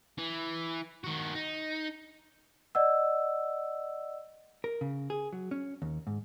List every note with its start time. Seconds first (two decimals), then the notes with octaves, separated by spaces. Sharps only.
0.18 E3
1.04 D#3 F#4
1.35 D#4
2.75 D5 D#5 F#5 E6
4.64 A#4
4.81 C#3
5.10 G#4
5.33 F#3
5.51 C#4
5.82 D#2
6.07 G#2